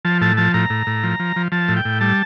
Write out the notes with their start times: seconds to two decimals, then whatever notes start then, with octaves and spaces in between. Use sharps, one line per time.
0.05 F3 A5
0.21 A2 A5
0.37 F3 A5
0.54 A2 A#5
0.70 A2
0.87 A2
1.03 F3
1.20 F3
1.36 F3
1.52 F3 A5
1.68 A2
1.77 G5
1.85 A2
2.01 G3 A5